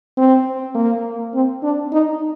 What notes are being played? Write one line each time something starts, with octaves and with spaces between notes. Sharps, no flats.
C4
A#3
C4
D4
D#4